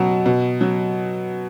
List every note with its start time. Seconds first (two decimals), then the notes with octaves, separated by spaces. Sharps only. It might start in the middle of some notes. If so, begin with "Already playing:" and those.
Already playing: B2 F#3
0.26 B2
0.61 F#3